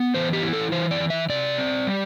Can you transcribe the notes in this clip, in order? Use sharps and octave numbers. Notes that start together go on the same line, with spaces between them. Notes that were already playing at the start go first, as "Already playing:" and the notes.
Already playing: B3
E3 C5
G4
E4
A4
E3 C5
D5
E3
E5
C3 D5
C4
G3